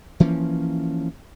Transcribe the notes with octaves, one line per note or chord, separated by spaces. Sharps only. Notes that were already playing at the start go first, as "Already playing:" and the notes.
E3 F3 A#3 C#4